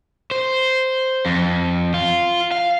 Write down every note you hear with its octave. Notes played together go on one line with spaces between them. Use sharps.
C5
F2
F4
F5